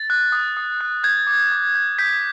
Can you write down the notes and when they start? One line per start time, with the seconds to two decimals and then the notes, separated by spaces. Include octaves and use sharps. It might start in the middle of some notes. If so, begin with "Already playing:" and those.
Already playing: A6
0.10 F#6
0.32 D#6
0.57 D#6
0.81 F#6
1.04 G6 G#6
1.27 D6
1.52 D6
1.75 G6
1.98 G6 B6